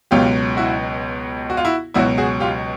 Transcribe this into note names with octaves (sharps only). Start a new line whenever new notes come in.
C#2 B2 F#3 F4 G4
E4 F#4
F#4
F4
E4 F#4
C#2 B2 F#3 E4 F#4
F#4 G#4
F4 G4